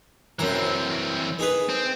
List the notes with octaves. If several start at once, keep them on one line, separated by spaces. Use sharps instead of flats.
F#2 E3 C4 A#5
D#3 G#4 B4
C4